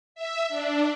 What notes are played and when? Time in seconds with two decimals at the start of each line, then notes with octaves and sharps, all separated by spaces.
0.15 E5
0.49 D4